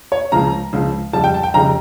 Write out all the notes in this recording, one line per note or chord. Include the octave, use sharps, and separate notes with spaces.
C#5
C#2 C#3 F3 A#5
C#2 C#3 F3
F2 C#3 G3 A5
G5
A5
G5
F2 C#3 G3 A#5